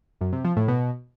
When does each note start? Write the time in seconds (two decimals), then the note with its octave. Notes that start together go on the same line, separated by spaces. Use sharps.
0.21 F#2
0.33 C3
0.44 F3
0.56 A2
0.68 B2